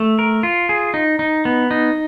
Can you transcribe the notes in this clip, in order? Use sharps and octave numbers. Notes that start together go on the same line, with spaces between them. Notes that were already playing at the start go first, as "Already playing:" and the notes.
Already playing: A3
A#4
F4
G#4
D#4
D#4
B3
D#4